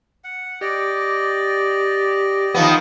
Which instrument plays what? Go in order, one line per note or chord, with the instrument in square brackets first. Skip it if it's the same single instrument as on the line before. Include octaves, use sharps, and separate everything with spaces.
[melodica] F#5
[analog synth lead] G4 [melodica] D5 D#5
[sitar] D#3 F3 B3